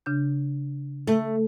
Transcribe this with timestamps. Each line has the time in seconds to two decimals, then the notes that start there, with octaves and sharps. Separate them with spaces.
0.06 C#3 D4 G6
1.07 A3